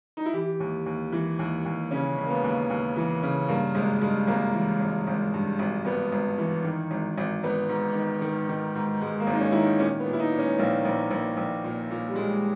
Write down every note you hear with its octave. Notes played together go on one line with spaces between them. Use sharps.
D#4
E4
E3 G4
D#2
D#2
E3
D#2
D#2
C#3 C#4
C#3
A#3
B3
D#2
D#2
E3
C#3
G2 A#3
G#1 G#3
G2 G#3
G#1 A#3
E3
G#1
G#1
G2
G#1
G#1 B3
G#1
E3
D#3
G#1
G#1
G#1 B3
G#2
D#3
D#3
D#3
G#2
G#2 G#3
A#3
G#1
D#4
C#4
D#3 E4
D#4
A#2 C#4
B3
A#2
E4
D#4
A#2
C#4
A#1 A#3
A#1
A#1
A#1
A#2
A#2
G3
A#2 G#3